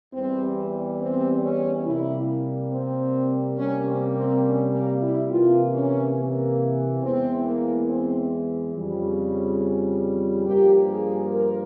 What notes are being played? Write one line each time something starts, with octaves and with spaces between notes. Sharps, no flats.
E2 E3 G3 C4
C4
C#4
C3 G3 A#3 E4
C4
C3 G3 A#3 C#4
C4
C4
C#4
A#3
E4
C3 E3 A#3 F4
C#4
A#3
E2 E3 G#3 C4
A#3
C4
F2 C#3 G3
G2 F3 A#3 G4
G#4
A#4